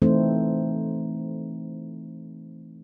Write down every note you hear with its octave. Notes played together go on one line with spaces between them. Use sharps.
E3 A3 C4 D#4 C5